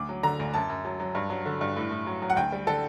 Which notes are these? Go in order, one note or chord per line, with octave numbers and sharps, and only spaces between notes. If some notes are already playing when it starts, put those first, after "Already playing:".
Already playing: D2 D6
F#3
D3 A#5
D2
F#2 A5
F#2
F#3
F#3
G2
F#3
D3
G2
A2
A2
F#3
F#3
F#5
D2 G5
G3
D3 A4